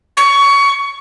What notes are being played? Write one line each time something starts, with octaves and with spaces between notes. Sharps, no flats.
C#6